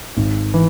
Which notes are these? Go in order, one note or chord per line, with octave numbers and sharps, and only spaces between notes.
G#1
E3